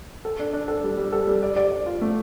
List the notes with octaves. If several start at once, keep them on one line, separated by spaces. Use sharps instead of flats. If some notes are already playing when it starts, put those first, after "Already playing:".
A4
D4
D4
A4
G3
G3
A4
G3
D5
D5
D5
F4
A3